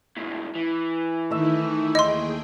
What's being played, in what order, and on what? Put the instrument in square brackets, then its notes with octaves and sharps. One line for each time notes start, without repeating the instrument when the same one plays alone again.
[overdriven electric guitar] C#2 A2
E3
[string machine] D#3 D#4 E4 [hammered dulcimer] A3 E5
[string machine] D#2 G#4 G5 [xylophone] D#5 C6